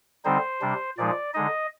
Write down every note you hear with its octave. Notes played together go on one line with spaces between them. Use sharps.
D3 G3 C4 D#4 C5
C3 G3 D4
A#2 F3 G#3 D#4 D5
D3 G#3 D#4 D#5